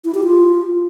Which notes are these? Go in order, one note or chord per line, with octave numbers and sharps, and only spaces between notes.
E4
G4
F4